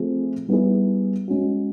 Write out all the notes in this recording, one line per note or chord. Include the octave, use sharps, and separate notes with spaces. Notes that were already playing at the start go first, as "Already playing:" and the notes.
Already playing: F3 A3 C4 F4 G#4
G3 B3 E4 G#4
G#3 C#4 F#4